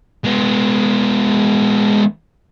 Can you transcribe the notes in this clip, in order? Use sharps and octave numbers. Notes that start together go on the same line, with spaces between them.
G#3 B3